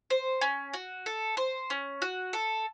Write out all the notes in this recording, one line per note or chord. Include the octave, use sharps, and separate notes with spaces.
C5
C#4
F#4
A4
C5
C#4
F#4
A4